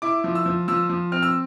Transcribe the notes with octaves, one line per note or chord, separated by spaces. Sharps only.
E4 D6
F3
E6
F3
F3 E6
F3
C4 F6
E6